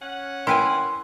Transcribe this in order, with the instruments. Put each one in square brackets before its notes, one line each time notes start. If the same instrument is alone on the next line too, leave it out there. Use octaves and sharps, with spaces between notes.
[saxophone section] C#4 F#5
[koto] E4 B4 G#5 [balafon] A#4 G5 [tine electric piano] C6